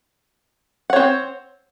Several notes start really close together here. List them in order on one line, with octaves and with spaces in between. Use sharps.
F#5 C#5 C4